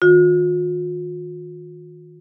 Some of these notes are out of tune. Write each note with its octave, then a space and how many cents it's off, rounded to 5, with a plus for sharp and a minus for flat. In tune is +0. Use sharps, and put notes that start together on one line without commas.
D#3 +15 F4 +45